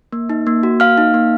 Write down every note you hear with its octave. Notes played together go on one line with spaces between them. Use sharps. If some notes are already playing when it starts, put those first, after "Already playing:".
A#3
D#4
A#3
F#4
A#3 F5 F6
D#4
A#3